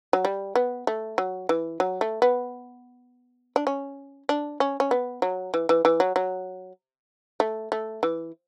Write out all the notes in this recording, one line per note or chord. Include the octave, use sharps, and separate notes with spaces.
F#3
G3
B3
A3
F#3
E3
F#3
A3
B3
D4
C#4
D4
C#4
C#4
B3
F#3
E3
E3
E3
F#3
F#3
A3
A3
E3